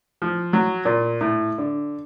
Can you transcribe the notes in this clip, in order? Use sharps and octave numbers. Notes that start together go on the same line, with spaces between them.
F3
F#3
A#2
A2
D3